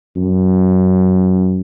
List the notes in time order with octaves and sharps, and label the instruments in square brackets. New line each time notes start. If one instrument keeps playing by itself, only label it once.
[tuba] F#2